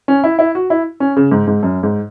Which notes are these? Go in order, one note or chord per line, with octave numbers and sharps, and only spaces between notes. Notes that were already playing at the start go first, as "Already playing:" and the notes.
C#4
E4
E4
F#4
E4
C#4
C#3
G#2
G#2
F#2
G#2